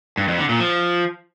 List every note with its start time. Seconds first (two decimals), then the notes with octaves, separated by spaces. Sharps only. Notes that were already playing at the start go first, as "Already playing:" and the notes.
0.17 G2
0.28 F2
0.39 D3
0.49 A#2
0.60 F3